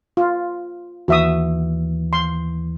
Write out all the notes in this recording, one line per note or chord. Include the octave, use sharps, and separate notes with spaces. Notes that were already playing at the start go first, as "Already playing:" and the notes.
F4
D#2 E3 F#4 E5 D#6
C6